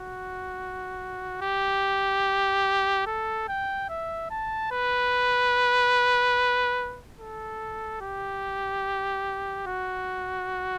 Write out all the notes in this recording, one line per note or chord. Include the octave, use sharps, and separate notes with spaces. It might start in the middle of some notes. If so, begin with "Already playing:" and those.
Already playing: F#4
G4
A4
G5
E5
A5
B4
A4
G4
F#4